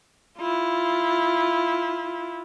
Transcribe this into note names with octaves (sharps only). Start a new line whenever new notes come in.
E4 F4